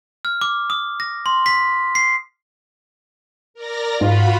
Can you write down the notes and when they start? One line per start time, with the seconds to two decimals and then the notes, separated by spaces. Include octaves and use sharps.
0.25 F6
0.41 D6
0.70 D#6
1.00 A#6
1.26 C6
1.46 B6
1.95 C7
3.54 A#4 D5 A#6
4.01 G#2 F4 F#4 F#5 B5